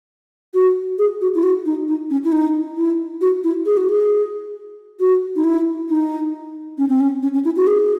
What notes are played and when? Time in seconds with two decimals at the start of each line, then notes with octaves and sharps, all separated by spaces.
0.54 F#4
0.99 G#4
1.21 F#4
1.35 E4
1.43 F#4
1.66 D#4
1.88 D#4
2.10 C#4
2.24 E4
2.32 D#4
2.77 E4
3.21 F#4
3.44 E4
3.66 G#4
3.77 F#4
3.89 G#4
5.00 F#4
5.36 D#4
5.44 E4
5.89 D#4
6.78 C#4
6.89 C4
7.00 C#4
7.23 C#4
7.34 C#4
7.45 E4
7.56 F#4
7.67 G#4